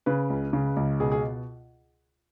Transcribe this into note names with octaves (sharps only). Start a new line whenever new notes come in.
C#3 B4
C#2
C#3
C#2
B2 G#4
G#4